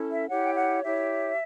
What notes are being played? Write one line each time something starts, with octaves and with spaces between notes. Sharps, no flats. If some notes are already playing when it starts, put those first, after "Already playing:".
Already playing: C#4 E4 A4
E5
E4 G4 C#5 F#5
G5
F#5
E4 G4 C#5 E5